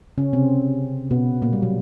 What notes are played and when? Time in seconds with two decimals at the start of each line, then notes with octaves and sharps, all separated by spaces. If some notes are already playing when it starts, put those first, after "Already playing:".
0.18 C#3 C#4
0.33 C3 C4
1.11 B2 B3
1.42 A#2 A#3
1.53 G3
1.62 F#3